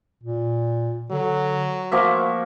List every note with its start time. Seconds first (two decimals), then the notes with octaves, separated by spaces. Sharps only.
0.24 A#2
1.11 D3 F#3
1.92 F3 A#3 F#4 E5